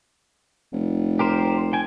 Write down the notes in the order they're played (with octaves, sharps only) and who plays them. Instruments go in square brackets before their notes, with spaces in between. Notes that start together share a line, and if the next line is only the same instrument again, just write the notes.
[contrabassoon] F1
[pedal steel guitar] G4 A#4 C5
G5 G#5